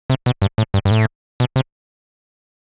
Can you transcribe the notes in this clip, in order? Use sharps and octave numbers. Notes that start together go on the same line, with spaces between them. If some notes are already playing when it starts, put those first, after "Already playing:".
C3
B2
G2
A2
G2
G2
A2
B2
C3